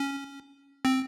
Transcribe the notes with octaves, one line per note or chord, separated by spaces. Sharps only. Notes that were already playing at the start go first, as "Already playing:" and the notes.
Already playing: C#4
C4